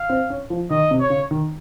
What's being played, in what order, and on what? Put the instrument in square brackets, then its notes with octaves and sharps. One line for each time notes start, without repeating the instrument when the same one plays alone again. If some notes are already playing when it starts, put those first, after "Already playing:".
Already playing: [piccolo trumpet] F5
[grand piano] C4
C#4
F3
[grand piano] D#3 [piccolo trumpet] D#5
[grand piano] C3
[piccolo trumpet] C#5
[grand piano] C#3
D#3